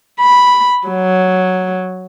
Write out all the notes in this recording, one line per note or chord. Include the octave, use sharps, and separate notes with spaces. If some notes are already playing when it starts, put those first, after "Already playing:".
B5
F#3